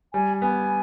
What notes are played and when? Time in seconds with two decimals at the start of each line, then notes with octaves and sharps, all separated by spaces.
0.13 G3 G#5
0.42 B3 G#5